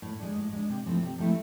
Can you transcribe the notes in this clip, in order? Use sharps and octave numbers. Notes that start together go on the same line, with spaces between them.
A2
G#3 D4
A2
G#3 D4
C3
F3 A3 C4 E4
C3
F3 A3 C4 E4